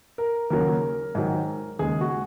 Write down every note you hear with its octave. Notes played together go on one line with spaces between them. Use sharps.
A#4
D#2 C#3 F#3 A#4
G#2 D#3 F#3
D#2 C#3 G#3 G#4
F#4